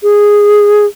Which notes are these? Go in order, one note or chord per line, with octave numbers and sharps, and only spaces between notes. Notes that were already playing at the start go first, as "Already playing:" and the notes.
G#4